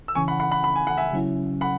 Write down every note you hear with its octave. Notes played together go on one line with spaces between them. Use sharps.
E6
C#3 E3 C#4 G#5 C#6
F#5 B5
F#5 B5
F#5 B5
B5
G#5
F#5
E5 G#5
C#3 F#3 C#4 E4
F#5 B5